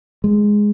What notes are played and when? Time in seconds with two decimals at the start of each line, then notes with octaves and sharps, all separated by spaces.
0.24 G#3